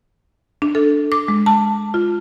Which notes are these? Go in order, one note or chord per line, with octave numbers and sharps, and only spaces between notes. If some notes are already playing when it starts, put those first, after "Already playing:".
D4
A4
D6
G#3
A5
F4